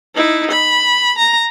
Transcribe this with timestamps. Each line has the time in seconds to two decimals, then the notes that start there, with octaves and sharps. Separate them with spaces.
0.15 D#4 E4
0.51 B5
1.18 A#5